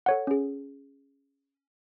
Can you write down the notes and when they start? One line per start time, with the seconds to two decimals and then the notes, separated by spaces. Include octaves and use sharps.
0.06 A4 C#5 F#5
0.27 C#4 G#4